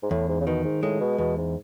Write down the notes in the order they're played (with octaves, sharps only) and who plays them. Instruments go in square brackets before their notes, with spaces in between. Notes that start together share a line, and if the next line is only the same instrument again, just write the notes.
[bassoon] G#2
[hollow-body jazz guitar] E2 [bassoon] A2
[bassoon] G#2
C#3
[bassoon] B2 [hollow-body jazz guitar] D#3
[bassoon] G#2
[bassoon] A2 [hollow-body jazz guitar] G#3
[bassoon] B2
[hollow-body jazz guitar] E2 [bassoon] B2
[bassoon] G#2